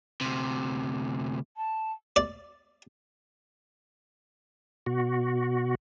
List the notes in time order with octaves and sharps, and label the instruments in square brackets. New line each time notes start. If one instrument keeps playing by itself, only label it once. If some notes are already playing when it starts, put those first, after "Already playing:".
[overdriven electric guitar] D2 C3
[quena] A5
[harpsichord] D5
[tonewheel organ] B2 F#4